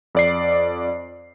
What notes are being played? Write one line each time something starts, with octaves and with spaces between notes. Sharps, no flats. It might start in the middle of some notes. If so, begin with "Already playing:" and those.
F2 D5 C7